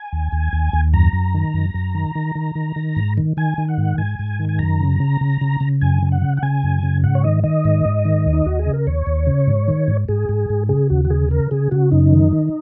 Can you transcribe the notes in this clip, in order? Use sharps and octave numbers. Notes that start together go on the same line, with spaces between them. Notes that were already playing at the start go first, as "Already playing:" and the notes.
Already playing: G#5
D#2
D#2
D#2
D#2
F#2 A#5
F#2
D#3
F#2
F#2
D#3
D#3
D#3
D#3
D#3
G#2
D#3
D#3 G#5
D#3
F#5
G#2
G#2 G#5
G#2
D#3
G#5
F#2 A#5
C#3
C#3
C#3
C#3
C#3
F#2 G#5
C#3
F#5
C#3
F#5
C#3 G#5
F#2
C#3
G#2 F#5
C#5
D#3 D#5
D#3 D#5
G#2
G#2
D#3
D#2
D#4
D#2 F#4
G#4
C#3
A#4
D#2 C#5
D#2
C#3
G#2
D#3
G#2
G#2 G#4
G#2
G#2
C#3 G#4
D#2 F#4
F#4
C#3 G#4
C#3 A#4
C#3 G#4
C#3 F#4
F#2 D#4
D#3
D#3